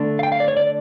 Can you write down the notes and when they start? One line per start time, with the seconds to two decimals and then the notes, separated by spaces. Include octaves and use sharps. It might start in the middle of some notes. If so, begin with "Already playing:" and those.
Already playing: D3 A3 D4
0.19 F5
0.23 G5
0.32 F5
0.40 D5
0.48 C#5
0.57 D5